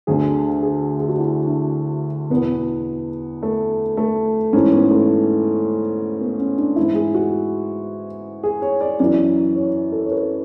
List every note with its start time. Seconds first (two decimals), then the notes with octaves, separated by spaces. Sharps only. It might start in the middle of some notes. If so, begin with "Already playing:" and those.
0.07 D2 D3 G#4
0.63 G#4
1.00 G#4
1.09 F#4
1.18 E4
1.46 D4
2.30 E2 B2 B3
3.43 A3
3.97 A3
4.53 G#2 E3 C#4
4.72 B3
4.90 A3
6.21 B3
6.40 C#4
6.58 D4
6.76 G#2 E3 E4
6.95 G#4
7.14 F#4
8.43 G#4
8.62 C#5
8.81 D5
9.00 F#2 E3 D5
9.55 C#5
9.92 A4
10.06 C#5
10.12 B4